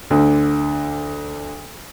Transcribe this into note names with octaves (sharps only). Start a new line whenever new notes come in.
D2 D3